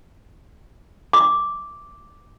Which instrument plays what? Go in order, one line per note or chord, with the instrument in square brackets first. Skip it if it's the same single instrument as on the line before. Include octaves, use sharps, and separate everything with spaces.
[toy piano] D6